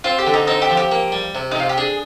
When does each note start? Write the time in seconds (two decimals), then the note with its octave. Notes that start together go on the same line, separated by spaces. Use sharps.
0.04 C4 F4
0.19 G4
0.27 D3
0.34 D#4
0.47 C4 D#4
0.62 G4
0.70 F3
0.77 G4
0.92 A#3
1.12 G3
1.35 C3
1.51 D#4
1.56 C3 F4
1.69 G4
1.77 D4 G#4